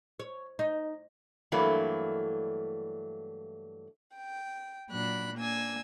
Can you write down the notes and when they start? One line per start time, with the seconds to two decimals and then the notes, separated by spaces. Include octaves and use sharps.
0.20 C#5
0.59 D#4
1.52 G2 E3 F#3 A3 A#3
4.17 G5
4.90 A#2 F#3 D4 B5 F#6
5.35 A#3 D4 G#5 E6